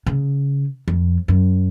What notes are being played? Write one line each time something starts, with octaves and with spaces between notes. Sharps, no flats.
C#3
F2
F#2